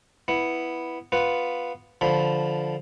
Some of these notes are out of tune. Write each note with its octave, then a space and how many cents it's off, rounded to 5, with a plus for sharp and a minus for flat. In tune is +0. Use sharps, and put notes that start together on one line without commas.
B3 +0 E4 +0
B3 +0 F4 +0 B4 +0
D3 +0 F3 +0 B5 +0